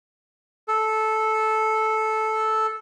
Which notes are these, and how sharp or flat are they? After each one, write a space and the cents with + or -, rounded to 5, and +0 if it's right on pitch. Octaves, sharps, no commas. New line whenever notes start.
A4 -10